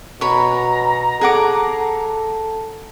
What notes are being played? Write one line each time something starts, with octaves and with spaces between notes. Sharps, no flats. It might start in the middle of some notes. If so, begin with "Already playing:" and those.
B2 C#5 A#5 B5
G#4 A4 F#5 D6